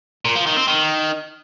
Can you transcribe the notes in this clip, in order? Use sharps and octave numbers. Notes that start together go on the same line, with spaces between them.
A#2
F3
D#3
C4
D#3